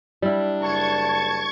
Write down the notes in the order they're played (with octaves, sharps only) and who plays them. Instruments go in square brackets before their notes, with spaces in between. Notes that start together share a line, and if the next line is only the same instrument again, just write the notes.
[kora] G3 E4 [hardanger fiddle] D4
[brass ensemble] F#1 A5 [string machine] C#6 G#6